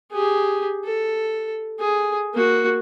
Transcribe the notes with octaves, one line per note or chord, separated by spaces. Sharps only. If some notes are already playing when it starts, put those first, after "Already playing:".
G4 G#4
A4
G#4
A#3 F#4